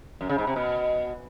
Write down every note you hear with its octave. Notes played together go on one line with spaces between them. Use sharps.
F#2
C#3
G#2
C3
B2